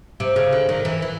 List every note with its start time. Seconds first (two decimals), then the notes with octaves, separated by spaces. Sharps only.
0.20 C3
0.36 C#3
0.53 D3
0.69 D#3
0.85 E3
1.02 E3